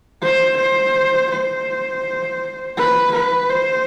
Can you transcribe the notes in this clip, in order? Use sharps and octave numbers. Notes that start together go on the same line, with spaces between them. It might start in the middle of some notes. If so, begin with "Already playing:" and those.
C5
C5
C5
B4
B4
C5